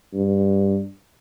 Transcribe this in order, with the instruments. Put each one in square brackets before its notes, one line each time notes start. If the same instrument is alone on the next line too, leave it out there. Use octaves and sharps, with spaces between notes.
[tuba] G2